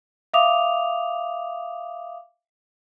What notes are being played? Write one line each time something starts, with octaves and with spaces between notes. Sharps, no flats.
E5 F5 D6 D#6 F7